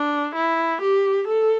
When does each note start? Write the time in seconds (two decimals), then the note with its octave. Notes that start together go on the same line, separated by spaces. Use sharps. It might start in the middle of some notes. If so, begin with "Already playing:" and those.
Already playing: D4
0.36 E4
0.82 G4
1.28 A4